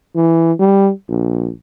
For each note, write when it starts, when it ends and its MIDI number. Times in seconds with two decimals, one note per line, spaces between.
0.16 0.53 52
0.59 0.91 55
1.08 1.50 34